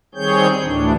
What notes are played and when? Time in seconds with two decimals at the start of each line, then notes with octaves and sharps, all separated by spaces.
0.15 D#3 G3 C4 G#4 C#5 G6
0.62 D2 A2 E3 D4